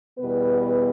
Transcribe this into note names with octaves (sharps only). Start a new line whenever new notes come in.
E2 B2 G3 B3 B4